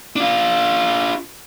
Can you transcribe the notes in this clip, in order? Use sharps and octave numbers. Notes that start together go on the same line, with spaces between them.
D4 F4